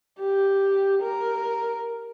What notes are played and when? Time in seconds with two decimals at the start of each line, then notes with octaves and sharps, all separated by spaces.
0.20 G4
1.03 A#4